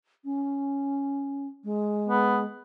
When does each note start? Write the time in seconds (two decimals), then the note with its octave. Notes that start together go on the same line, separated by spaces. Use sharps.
0.25 C#4
1.64 G#3
2.09 B3